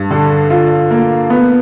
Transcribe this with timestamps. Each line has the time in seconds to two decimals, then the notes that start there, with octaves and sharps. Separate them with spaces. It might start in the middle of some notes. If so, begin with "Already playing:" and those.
Already playing: G2
0.11 D3
0.50 F4
0.91 A#3
1.30 B3